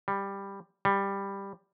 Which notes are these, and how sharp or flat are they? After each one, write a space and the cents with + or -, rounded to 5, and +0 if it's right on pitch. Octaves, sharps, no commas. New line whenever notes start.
G3 +10
G3 +10